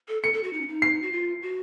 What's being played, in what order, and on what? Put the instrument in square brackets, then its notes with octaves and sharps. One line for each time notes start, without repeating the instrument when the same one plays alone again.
[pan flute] A4
[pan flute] A4 [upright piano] C#7
[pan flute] A4
F#4
D#4
C#4
D#4
[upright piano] C7
[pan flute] F#4
F4
F#4